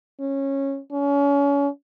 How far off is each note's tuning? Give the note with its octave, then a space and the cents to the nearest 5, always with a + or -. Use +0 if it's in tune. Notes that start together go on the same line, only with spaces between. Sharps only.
C#4 -15
C#4 +30